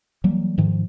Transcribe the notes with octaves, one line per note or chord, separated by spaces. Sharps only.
E3 F#3 G3 A#3
G#2 D#3 F3